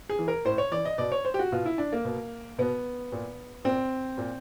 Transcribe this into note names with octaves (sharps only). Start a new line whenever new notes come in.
G#4
E3
A#4
A2 C5
C#5
E3 D5
D#5
B2 D5
C#5
C5
G4
F#4
B2 F4
E4
D4
A#3
B2
B2 B3
A#2
A#2 C4
A#2